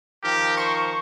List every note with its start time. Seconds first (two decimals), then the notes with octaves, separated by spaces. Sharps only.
0.23 D#3 F3 G4 A#4
0.57 C5 C#6